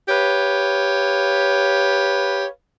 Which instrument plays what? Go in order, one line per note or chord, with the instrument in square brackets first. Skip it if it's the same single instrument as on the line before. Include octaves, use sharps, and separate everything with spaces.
[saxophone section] G4 B4 C#5 F5